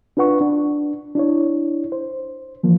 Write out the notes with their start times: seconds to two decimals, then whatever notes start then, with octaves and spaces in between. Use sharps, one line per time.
0.17 D4 F4 B4 F#5 C#6
0.41 D4
1.15 D4 E4 C#5
1.92 C5
2.63 E3 F3 A#3